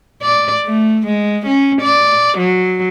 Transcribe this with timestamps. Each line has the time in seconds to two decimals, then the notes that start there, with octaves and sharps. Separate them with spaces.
0.22 D5
0.65 A3
1.07 G#3
1.46 C#4
1.81 D5
2.38 F#3